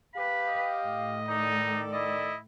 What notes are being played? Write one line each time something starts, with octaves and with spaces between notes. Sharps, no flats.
G4 B4 F5
D#5
A2
D#3 D#4 A4 D5
E4 D#5